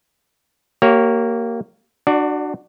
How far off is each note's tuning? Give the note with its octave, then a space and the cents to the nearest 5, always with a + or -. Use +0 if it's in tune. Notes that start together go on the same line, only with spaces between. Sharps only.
A#3 -10 G4 -35 C#5 +0
D4 +25 F#4 +0 D5 -5